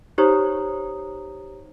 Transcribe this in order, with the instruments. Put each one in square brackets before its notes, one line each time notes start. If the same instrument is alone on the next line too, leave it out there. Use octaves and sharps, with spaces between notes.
[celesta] D#4 G4 C5 C#5 A#5 D#6